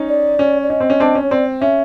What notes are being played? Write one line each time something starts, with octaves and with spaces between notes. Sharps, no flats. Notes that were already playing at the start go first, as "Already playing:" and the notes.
Already playing: C#4 D#4
D5
C#4
D5
C#4 D#5
C4
C#4
C4 D4
C#4
C#5
C4 D5
C#4 E5